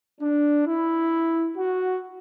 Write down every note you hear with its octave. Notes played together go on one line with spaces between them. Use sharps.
D4
E4
F#4